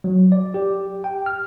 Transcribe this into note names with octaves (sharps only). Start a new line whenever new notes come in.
F#3
D5
G4
G5
F6